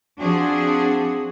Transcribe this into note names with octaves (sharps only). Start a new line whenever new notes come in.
F3 C4 D4 F#4 G#4